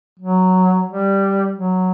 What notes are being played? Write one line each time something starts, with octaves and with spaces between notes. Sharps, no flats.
F#3
G3
F#3